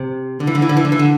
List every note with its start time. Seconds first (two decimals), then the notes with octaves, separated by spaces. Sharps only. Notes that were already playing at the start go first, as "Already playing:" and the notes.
Already playing: C3
0.40 D3
0.47 E3
0.55 D3
0.62 E3
0.69 D3
0.77 E3
0.85 D3
0.92 E3
0.99 D3